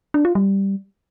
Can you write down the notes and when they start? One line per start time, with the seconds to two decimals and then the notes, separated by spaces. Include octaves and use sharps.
0.14 D4
0.25 F4
0.35 G3